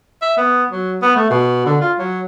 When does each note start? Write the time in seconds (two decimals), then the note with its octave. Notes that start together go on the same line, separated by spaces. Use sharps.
0.22 E5
0.38 B3
0.71 F#3
1.02 B3
1.16 A3
1.30 B2
1.66 D3
1.82 F4
1.99 F#3